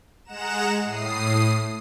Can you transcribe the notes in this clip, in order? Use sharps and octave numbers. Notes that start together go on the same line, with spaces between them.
G#3 F#5 A#5 E7
A2 D#6 C7